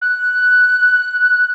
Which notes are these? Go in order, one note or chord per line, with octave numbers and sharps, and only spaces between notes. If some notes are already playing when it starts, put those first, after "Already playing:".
F#6